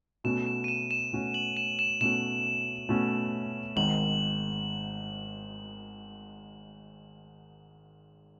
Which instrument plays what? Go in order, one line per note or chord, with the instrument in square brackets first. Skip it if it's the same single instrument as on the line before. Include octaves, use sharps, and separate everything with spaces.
[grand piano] B2 A3 C#4 F#4 [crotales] E7
[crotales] E7
D#7
E7
E7
[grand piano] B2 A3 C#4 F#4
[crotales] F#7
E7
E7
[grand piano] B2 A3 C#4 F#4 [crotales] E7
[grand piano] B2 A3 C#4 F#4
[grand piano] G#1 G#2 D#3 [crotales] F#7